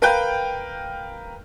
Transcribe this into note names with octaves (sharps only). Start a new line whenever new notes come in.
A#4 B4 F5 G5 G6